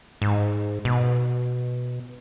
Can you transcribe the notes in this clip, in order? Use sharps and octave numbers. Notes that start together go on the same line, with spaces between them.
G#2
B2